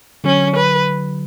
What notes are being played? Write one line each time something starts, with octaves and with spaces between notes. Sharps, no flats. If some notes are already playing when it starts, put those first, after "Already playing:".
D3 F#3 C#4
B4